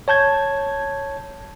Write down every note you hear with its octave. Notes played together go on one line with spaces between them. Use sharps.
C#5 A5 G6 G#6